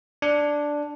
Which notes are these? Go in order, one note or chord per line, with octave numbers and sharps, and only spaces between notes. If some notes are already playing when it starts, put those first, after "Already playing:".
D4